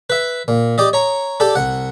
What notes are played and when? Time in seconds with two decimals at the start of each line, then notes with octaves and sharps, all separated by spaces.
0.10 B4 E5
0.48 A#2
0.78 G4 D5 D#5
0.93 C#5 A#5
1.40 G4 A4 D5
1.55 C2 F#5